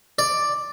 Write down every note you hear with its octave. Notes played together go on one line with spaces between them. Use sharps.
D5